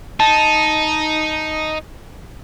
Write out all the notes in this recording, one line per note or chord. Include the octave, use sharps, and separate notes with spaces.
D#4 A5